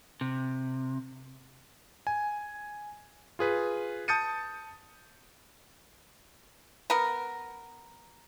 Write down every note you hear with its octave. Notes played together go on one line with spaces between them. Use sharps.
C3
G#5
F4 G#4 B4
A5 D#6 G6 A6 C#7 D#7
B3 A#4